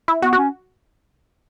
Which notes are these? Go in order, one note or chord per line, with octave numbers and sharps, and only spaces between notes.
E4
B3 F#4
F#4
C#4